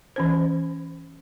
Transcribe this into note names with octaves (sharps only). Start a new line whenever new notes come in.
E3 C#4 C5